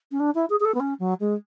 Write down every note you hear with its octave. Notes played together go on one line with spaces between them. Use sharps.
C#4
D4
E4
G#4
G#4
A4
B3
C#4
F#3
G#3